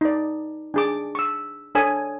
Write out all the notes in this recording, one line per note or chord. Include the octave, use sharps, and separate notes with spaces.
D#4 D5
D4 G#4 D6
C#6 E6
D4 A4 C#5 G#5 D#6